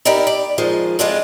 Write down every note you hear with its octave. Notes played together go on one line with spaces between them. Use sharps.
D#4 E4 G4 A#4 D5 E5
D5
D#3 F3 G#3
A2 G#3 C4 D4 F4 A4